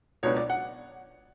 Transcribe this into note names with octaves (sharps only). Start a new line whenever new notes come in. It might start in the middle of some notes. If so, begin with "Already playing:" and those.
C#2 B2 F#3 B3 D4 C#5
D5
F#5